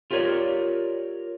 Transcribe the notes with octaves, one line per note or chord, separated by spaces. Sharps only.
F4 G4 A#4 B4 C#5 D5